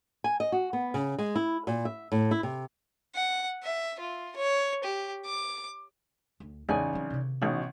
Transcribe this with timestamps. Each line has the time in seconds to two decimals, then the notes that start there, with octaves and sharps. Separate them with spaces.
0.24 G#5
0.40 D#5
0.52 F#4
0.73 B3
0.94 C#3
1.18 G#3
1.36 E4
1.67 A#2
1.85 E5
2.12 A2
2.31 E4
2.43 C3
3.15 F#5
3.63 E5
3.99 F4
4.36 C#5
4.84 G4
5.25 D6
6.40 D2
6.69 A1 E2 C#3 D#4 D5 G#5
6.93 F#3 C4
7.10 C3 D#3
7.42 A1 B2 D#4